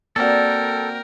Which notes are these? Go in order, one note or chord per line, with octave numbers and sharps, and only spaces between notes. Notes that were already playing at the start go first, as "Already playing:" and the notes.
A#3 C4 F#4 A4 A#4 D5 G5